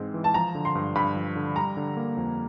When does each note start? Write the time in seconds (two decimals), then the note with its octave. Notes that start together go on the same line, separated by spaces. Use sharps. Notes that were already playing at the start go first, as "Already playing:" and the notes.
Already playing: G#2 E3 G#3 C4
0.14 E3
0.24 A5
0.34 F3 A#5
0.55 D3
0.65 C6
0.75 G2
0.95 G2 B5
1.16 F3
1.36 D3
1.56 G3 A#5
1.77 D3
1.97 A#3
2.17 F2